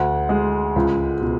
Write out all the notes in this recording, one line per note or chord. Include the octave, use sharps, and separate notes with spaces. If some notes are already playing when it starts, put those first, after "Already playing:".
Already playing: D2 F#5
G#3
C#2
B2